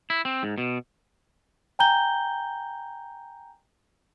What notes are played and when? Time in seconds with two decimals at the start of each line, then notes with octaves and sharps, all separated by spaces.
0.10 E4
0.25 C4
0.43 G#2
0.58 B2
1.79 G5 G#5 A#5 G6 G7